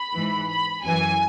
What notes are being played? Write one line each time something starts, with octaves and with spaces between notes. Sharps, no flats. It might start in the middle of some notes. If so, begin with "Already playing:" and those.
Already playing: B5
G#2 E3
B5
F#2 E3 G#5